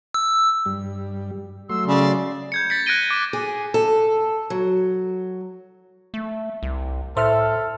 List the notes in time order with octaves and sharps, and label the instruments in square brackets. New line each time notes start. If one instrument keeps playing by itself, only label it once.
[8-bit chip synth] E6
[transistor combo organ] G2 G3
[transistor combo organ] F#3 A3 C6 [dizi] E6
[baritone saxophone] C#3 [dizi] D5
[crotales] G6 G#6 C#7
A6 B6 C#7
F#6 G#6 A#6 D7 D#7 G7
D6
[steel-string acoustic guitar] G#4
A4
F#3
[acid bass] A3
C2
[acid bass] A2 [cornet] A4 [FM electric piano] C5 E5 F6